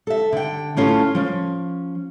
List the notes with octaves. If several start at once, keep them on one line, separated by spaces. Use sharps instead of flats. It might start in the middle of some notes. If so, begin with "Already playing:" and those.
A4 E5
D3 G5
A2 C#4 F4 A4
F3 C#4